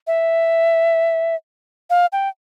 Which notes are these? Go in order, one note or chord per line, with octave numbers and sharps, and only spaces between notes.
E5
F5
G5